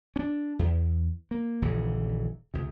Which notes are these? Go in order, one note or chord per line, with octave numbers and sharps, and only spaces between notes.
C#4 D4
E2
A#3
D#1 A#1 C#3 E3
C#2 C3